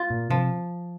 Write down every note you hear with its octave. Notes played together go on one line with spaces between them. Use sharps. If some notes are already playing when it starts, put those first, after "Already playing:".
Already playing: F4
A#2
C3 F3